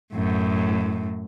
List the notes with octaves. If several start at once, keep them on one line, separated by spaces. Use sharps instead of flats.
F#2 A2